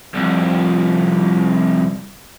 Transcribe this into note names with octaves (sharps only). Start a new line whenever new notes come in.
C2 F2